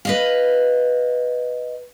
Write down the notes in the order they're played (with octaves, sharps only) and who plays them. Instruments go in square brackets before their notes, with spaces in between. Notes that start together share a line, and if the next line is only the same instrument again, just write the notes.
[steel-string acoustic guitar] B4 D#5 F5